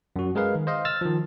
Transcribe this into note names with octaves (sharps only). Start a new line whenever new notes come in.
F#2 F#4
G#3 G#4 A#4 B4 F5
D#3
C5 D#5 F5
E6 F6 A6
D#3 F3